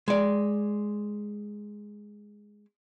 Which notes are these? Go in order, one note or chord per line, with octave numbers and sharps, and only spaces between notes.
G#3 D5